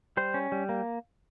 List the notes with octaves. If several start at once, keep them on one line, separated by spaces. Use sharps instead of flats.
G3 C5
C#4
G3
A#3